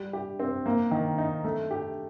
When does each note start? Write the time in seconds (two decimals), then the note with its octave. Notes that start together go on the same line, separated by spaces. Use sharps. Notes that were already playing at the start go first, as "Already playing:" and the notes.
Already playing: G3
0.13 G4
0.39 C4
0.66 A#3
0.91 D#3
1.18 D#4
1.45 A3
1.71 G4